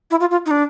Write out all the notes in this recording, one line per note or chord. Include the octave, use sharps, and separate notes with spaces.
E4
F4
F4
D#4
D4